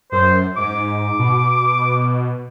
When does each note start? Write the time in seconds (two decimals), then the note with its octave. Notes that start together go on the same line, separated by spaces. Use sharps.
0.12 F#2 C5
0.57 G#2 D6
1.19 B2